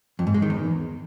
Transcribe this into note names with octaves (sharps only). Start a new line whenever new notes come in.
F2
G#2
G#3
D#3
E2